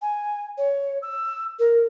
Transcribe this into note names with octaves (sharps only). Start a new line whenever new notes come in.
G#5
C#5
E6
A#4